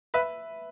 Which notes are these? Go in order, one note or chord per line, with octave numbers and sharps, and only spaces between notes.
B4 E5